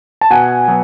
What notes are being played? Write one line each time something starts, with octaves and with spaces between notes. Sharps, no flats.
A5
B2 F#5 G#5
F#3 B3